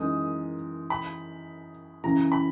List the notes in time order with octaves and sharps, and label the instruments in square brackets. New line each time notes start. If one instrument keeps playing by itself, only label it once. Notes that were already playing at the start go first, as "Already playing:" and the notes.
Already playing: [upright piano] F#2 E3 G#3 D#4 A#4 [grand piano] D#6
[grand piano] B5
[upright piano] F#2 C#3 E3 [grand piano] A#5
[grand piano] B5